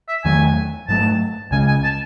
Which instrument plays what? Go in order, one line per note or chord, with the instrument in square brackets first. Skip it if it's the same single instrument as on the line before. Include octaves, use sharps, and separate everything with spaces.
[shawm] E5
[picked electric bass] E2 D#3 F#3 A3 [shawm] G#5
[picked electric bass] G#2 F#3 A3 [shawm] A5
[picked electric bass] C#2 C#3 G#3 [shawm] G#5
[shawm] G#5
A5